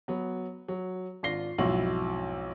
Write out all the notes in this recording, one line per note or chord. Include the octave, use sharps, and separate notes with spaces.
F#3 B3
F#3
G#1 D4 F4 A#6 C7 G7
B1 F2 G#2 E4 F#4 F#7